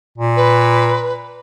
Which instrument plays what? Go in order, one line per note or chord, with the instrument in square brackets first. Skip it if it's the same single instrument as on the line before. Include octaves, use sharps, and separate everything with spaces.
[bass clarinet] A#2
[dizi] B4